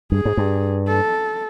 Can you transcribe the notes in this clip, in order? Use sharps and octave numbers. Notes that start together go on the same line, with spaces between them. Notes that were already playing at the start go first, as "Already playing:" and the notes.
G2 G#4
G#2
G2
A4